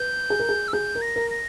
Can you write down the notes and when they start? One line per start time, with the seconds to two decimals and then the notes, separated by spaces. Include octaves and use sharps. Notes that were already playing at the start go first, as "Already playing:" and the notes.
Already playing: B4 G6
0.30 G#4
0.39 A#4
0.49 G#4
0.68 E6
0.73 G#4 G6
0.95 A#4
1.02 A#6
1.16 A#4
1.31 A#6